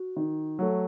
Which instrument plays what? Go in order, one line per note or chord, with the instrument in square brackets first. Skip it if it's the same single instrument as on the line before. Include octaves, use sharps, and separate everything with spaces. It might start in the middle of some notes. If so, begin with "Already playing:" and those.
Already playing: [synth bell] F#4
[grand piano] D#3
F#3 A3